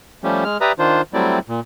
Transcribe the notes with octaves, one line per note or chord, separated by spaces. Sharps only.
F3 G3 A3 C#4 G4
G#3 F6
G4 B4 D5 E5 A#5 D#6
D#3 D4 F4 C5
F#3 G3 A3 C4 E4 D5
A#2